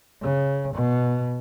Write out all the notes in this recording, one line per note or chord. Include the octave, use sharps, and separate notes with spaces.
C#3
B2